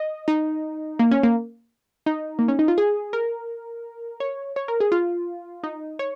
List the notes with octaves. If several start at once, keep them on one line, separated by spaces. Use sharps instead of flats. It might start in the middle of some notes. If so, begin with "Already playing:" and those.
Already playing: D#5
D#4
A#3
C#4
A#3
D#4
A#3
C#4
D#4
F4
G#4
A#4
C#5
C#5
A#4
G#4
F4
D#4
C#5